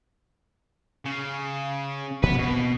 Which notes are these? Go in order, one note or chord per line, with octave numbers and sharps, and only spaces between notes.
C#3
D2 A#2 F3 B3 B4
B2 A#3 C4